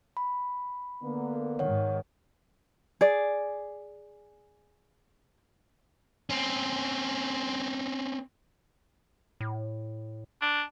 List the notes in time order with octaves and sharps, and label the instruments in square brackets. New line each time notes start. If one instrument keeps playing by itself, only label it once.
[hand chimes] B5
[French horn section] D3 A#3 B3
[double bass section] G#2 D#3 [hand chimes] C#5 F#5
[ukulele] G#4 D5
[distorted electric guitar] C4 C#4
[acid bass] A2
[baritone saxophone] D4